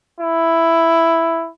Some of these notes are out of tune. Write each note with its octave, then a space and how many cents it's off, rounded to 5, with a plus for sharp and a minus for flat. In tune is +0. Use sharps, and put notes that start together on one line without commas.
E4 +5